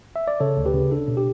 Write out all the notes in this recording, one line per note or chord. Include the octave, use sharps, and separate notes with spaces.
E5
D5
C#3 A4 C#5
D2
G4 B4
C#3
D4 A4
B2
G4